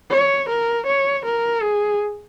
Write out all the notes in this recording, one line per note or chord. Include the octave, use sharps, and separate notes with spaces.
C#5
A#4
C#5
A#4
G#4